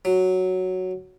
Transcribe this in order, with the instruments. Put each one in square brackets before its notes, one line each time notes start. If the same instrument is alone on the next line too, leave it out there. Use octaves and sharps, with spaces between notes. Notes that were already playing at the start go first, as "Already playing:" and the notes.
[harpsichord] F#3